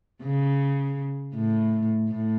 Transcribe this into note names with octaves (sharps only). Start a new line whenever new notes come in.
C#3
A2
A2